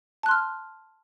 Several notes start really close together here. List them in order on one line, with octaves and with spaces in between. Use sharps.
A5 F#6 C6 F6